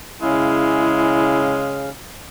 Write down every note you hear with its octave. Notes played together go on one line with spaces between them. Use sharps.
C#3 G#3 C#4 E4 F5